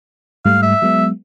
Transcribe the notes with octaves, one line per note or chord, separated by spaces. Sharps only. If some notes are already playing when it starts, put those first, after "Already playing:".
G#2 G3 A3 F5
E5
F#3 G#3 B3